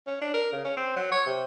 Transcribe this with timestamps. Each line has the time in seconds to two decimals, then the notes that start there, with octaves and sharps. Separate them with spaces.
0.07 C#4
0.21 D4
0.34 A#4
0.53 C#3
0.65 C#4
0.77 C4
0.96 F#3
1.12 C#5
1.26 C3